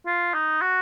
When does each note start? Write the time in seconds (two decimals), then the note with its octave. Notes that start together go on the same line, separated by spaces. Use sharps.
0.06 F4
0.34 D#4
0.62 F#4